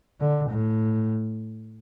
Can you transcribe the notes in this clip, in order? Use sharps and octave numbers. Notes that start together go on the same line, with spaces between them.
D3
A2